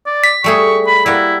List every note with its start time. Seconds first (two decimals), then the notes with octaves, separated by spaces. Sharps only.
0.06 D5
0.24 B6
0.44 G3 A3 G#4 C#6
0.87 B5
1.06 G3 A#3 E4 F#4